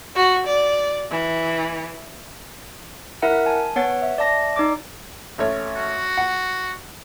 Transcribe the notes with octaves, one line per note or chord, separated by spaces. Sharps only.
F#4
D5
E3
E4 A#4 E5 F#5
G#5 A5
B3 C#5 F#5 A6
E5
D5 E5 A5 A#6
D#4 D5 D6
A1 A3 C#5
F#4
F#5